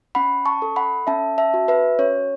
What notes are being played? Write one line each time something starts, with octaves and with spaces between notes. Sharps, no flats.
C#4 F#5 B5
A5 C#6
A4
F#5 B5
C#4 E5 A5
E5 A5
F#4
B4 E5
C#4 C#5